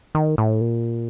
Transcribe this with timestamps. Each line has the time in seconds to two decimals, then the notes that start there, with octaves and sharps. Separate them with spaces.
0.15 D#3
0.38 A2
0.61 A#2